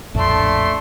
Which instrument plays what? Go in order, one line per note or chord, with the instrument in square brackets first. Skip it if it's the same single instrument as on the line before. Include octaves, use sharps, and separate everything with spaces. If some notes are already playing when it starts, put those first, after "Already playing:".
[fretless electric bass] A#1 F2 A2 [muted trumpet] A3 [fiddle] D4 C6